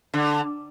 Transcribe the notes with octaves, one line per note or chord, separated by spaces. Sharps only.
D3